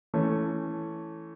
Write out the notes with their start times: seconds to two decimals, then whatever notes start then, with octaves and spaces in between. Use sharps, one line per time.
0.14 E3 A3 C#4